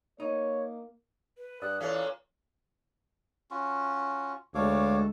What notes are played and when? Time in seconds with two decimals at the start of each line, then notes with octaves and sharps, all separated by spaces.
0.20 A#3 D#4 C#5
1.38 B4
1.62 G2 D5 D#6 E6 F#6
1.80 A#2 E3 C#4 A4 F5 F#6
3.51 C#4 F4 F#4
4.55 D2 G#3 F#4 A4 C#5 F5 D6